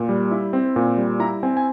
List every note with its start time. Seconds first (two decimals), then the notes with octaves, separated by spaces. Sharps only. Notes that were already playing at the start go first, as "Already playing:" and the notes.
Already playing: A#2
0.09 G3
0.31 E4
0.53 C4
0.76 A#2
0.97 G3
1.20 E4 A#5
1.43 C4 G#5
1.57 G#5